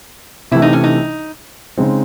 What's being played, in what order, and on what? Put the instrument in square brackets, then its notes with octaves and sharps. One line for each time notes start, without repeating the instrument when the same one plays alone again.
[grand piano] C3 E3 A3 [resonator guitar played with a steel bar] E4
[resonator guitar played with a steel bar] D#4
C#4
D#4
[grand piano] C#3 G#3 C4 D#4